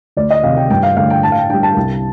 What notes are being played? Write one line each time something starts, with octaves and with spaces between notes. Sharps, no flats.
D2 D5
D#5
C3 D#3 F5
G5
G2 G5
F5
D3 A3 D4 F5
G5
A2 A5
F5
G5
G3 D4 G5
A5
C2